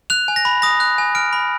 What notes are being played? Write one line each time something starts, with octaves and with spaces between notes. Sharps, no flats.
F#6 F7
G#5
A#6
B5
D#6 A#6
F#6
G#5
F6 D7
B5